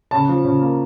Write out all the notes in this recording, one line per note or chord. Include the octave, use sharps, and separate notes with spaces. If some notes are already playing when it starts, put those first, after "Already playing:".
C#3 A5
F3
C#3
A#3